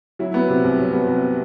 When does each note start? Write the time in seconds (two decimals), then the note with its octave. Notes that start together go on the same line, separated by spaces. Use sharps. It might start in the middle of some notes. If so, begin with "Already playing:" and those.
0.19 F#3 E4
0.34 B3
0.49 C3
0.64 C2
0.79 F#3
0.93 B3
1.07 C3